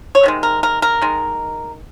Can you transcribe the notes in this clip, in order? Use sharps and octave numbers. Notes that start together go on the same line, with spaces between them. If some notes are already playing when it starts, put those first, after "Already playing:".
C#5
C3 D#3 G#3
A#4
A#4
A#4
D#3 G#3